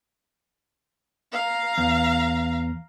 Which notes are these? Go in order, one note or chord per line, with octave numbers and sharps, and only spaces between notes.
F5 A#5
E2